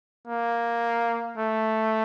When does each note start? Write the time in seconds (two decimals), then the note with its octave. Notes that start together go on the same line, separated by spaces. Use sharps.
0.27 A#3
1.37 A3